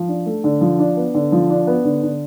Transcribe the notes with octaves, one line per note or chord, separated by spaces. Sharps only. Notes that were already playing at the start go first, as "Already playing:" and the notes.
Already playing: F3
D4
A3
D3
F3
D4
B3
D3
F3
D4
B3
D3
D3